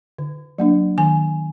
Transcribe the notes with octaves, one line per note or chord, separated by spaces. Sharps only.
D3
F#3 A#3 D4
D#3 G#5